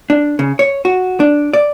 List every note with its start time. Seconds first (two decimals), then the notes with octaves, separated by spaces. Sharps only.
0.10 D4
0.39 C#3
0.59 C#5
0.85 F#4
1.20 D4
1.53 D5